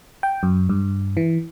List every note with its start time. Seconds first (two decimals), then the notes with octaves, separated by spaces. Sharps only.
0.23 G5
0.43 F#2
0.69 G2
1.17 E3